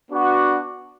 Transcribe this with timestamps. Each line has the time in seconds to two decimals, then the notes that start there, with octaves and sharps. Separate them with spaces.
0.10 B3 D4 F#4